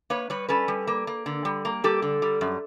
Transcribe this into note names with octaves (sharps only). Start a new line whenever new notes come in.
A#3 B4 C#5
G3 B4 C#5
C#4 A4 B4
G3
A#3
A#3
D3
G3
A#3
G3 G4 A4
D3
G3
F#2